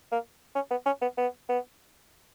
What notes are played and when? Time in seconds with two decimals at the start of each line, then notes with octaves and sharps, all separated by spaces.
0.12 A#3
0.55 C#4
0.71 B3
0.86 C#4
1.02 B3
1.18 B3
1.49 B3